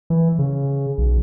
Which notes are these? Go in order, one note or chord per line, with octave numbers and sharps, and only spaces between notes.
E3
C#3
B1